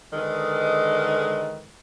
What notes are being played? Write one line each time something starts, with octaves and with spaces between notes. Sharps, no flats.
D3 D#3 G#3 A4 B4